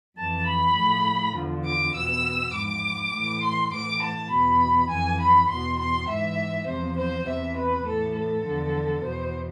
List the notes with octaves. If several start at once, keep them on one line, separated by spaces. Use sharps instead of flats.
F2 E3 A5
B5
A2 F3
E2 D3 F3
D6
E2 B2 E6
G#2 F3 D6
A2 E3
C6
A2 E3 D6
A5
E2 B2 B5
F2 E3 G#5
B5
E2 B2 C6
C6
G#2 E3 E5
E2 C3 F3 C5
C5
E2 C3 E3 E5
B4
A2 E3 A4
A4
E2 D3 F3
E2 B2 C5